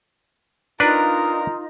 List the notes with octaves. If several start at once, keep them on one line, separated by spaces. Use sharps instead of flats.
D4 D#4 F4 A#4 B4 D5